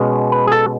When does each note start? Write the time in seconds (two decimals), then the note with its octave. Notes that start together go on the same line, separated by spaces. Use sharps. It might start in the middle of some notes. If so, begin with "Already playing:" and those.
Already playing: B2 G#3 C#4
0.32 B4
0.47 G#4
0.52 A4